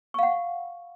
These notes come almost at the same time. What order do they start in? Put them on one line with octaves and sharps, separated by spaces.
C#6 F5 F#5